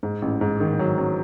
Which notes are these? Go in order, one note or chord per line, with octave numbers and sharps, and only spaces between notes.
G#2
A1
G#2
D#3
F#3
F#3